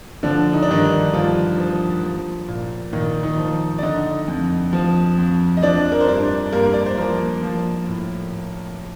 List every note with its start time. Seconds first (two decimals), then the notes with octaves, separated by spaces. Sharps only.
0.23 D3 F3 D4
0.53 D#4
0.62 D4
0.68 G2 D#3 D#4
1.13 G2 F3 F4
1.58 F3
2.03 F3
2.48 A#2
2.93 A#2 D#3 D#4
3.23 D#3 D#4
3.38 F3
3.78 D5
3.83 D3 D#4 D#5
4.28 F2
4.73 F3
5.18 F2
5.57 D#5
5.63 F3 D4 D5
5.92 A#4
6.00 C5
6.07 G2 D4 D5
6.52 G2 A#3 A#4
6.74 D5
6.86 C5
6.97 F3 A#3 A#4
7.42 F3
7.87 A2